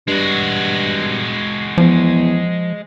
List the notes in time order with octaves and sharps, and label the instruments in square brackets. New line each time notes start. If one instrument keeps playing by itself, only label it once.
[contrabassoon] G2 [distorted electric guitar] G#3 F#4
[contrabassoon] E2 [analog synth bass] F3